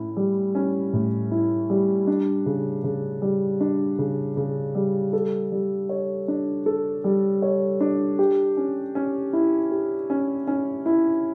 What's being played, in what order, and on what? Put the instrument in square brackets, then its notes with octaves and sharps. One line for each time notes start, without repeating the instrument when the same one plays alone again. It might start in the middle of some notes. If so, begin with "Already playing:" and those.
Already playing: [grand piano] A2 C#4 E4
G3
C#4
A2
E4
G3
D4
C#3
C#3
G3
D4
C#3
C#3
G3
A4
G3
C#5
D4
A4
G3
C#5
D4
G4
C#4
C#4
E4
G4
C#4
C#4
E4